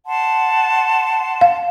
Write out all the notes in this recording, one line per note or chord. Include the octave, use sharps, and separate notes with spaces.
F#5 A5 C6
F5